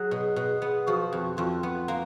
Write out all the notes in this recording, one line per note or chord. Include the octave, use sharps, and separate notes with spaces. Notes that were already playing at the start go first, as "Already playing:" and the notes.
Already playing: F#3 G#4
B2
B2
B3
F3 F#4
F2
F2 F4
B3
A#3